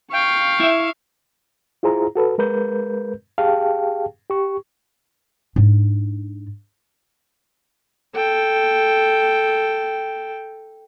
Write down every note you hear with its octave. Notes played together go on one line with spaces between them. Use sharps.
F5 G5 C#6
E4 E5
E4 F4 G#4 C5 A#5
F#4 A4 B4
G#3 A#4 B4 G6
G4 G#4 F5 G5 A5
G4 C#6
G#2 D4
A4 G5